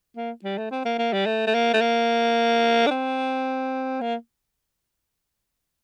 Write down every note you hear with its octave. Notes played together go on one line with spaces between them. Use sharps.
A#3
G3
A3
C4
A#3
A#3
G3
A3
A3
A#3
A3
A#3
D4
C4
A#3